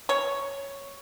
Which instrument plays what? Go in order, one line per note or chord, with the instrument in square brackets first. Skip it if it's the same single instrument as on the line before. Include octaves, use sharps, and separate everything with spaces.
[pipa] C#5